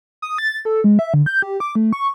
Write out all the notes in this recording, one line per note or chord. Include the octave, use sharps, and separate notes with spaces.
D#6
A6
A4
G#3
E5
D3
G6
G4
D6
A3
C#6